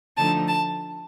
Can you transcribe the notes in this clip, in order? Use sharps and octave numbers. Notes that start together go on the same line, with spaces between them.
D3 F3 A3 D#4 A5
A5